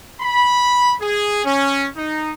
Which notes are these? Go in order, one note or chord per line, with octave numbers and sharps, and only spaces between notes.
B5
G#4
C#4
D#4